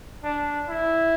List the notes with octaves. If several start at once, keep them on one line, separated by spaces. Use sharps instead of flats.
D4
E4